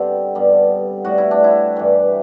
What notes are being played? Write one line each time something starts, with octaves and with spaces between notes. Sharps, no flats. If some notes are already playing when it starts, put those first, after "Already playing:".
Already playing: G2 D3 G3 B3 C4
G2 D3 G3 B3
A2 G3 B3 F#4
E4
D4
E4
G2 E3 G3